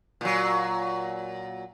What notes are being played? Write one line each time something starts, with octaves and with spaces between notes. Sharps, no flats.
A#2 F#3